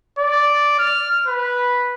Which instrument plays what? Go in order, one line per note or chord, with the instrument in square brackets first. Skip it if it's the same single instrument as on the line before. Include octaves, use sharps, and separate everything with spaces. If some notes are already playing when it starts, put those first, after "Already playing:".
[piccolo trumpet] D5
F6
B4